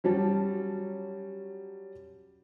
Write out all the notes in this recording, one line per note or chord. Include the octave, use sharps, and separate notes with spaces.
F#3 G3 C#4 A5